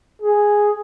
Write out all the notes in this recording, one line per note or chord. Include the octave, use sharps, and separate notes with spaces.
G#4